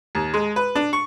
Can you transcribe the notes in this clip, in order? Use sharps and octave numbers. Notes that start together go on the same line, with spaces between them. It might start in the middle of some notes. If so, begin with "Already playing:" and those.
D#2
G#3
B4
D4
C#6